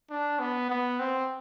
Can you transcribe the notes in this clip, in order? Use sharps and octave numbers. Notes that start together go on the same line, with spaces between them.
D4
B3
B3
C4